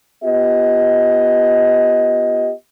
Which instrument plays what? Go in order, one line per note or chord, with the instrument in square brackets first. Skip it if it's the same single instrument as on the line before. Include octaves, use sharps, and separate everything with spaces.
[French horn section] B3 F4 G4 D#5